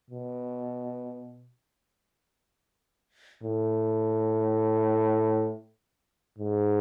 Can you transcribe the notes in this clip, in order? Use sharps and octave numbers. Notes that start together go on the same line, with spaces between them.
B2
A2
G#2